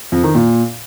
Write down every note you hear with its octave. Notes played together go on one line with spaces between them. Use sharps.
F2
D#3
A#2